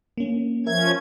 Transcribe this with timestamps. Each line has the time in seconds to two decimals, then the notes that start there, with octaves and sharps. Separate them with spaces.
0.17 A#3 C#4
0.67 F3 C#4 A#4 E5 G#6